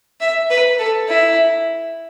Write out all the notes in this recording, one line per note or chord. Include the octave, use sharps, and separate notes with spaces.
E5
B4
A4
E4